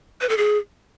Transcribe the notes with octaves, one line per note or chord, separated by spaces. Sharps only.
B4
A4
G#4